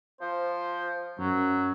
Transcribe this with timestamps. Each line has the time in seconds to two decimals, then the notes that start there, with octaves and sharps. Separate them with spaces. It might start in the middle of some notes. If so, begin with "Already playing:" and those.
0.21 F3 C5
1.19 F#2 F#3